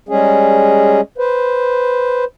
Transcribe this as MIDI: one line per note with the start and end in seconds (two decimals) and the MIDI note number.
0.09 1.01 55
0.09 1.01 56
0.09 1.01 61
0.09 1.01 68
1.18 2.25 71
1.18 2.25 72